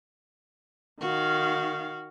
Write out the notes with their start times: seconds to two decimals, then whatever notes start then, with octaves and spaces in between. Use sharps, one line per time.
1.00 D#3 F#4 F5